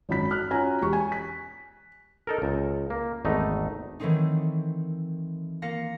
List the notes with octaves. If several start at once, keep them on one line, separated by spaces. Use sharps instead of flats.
G#1 F#2 F#3 B5 B6
F6 F#6
C#4 F4 F#4 C#5 G#5 A#5
E1 G4 C#6
G#5
B6
D#4 A4 A#4
C#2
A#3
G#1 E2 A3 D#4
D#3 E3 F#3 A3 C4 D#4
A#3 F4 F5 A#6 C#7